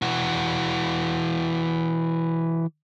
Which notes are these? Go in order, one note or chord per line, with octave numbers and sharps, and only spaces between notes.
E3 F#4